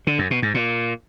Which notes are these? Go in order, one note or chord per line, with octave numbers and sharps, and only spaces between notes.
D3
F#2
B2
G#2
A#2